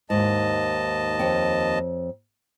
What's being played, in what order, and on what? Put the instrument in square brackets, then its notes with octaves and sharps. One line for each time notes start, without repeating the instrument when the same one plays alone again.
[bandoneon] D#2 D#5 A5 [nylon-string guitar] G#2
[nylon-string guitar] F2 C#5 G5